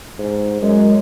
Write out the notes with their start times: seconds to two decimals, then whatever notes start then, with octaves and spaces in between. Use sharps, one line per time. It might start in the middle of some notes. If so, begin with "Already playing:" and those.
0.18 G#2
0.62 F#2 G#3